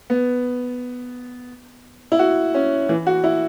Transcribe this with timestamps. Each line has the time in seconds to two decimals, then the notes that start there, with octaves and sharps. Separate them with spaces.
0.10 B3
2.12 E4
2.19 F#4
2.54 C#4
2.89 E3
3.07 F#4
3.24 E4